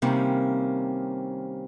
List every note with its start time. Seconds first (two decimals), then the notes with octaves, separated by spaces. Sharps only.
0.02 C3 D#3 G3 A#3 C4 C#4